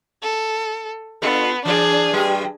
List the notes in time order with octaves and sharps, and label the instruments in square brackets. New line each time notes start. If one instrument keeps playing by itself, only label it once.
[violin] A4
[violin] B3 [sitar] D4 F4 A4
[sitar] E3 D5 [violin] D4 G#4
[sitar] G2 F#3 G4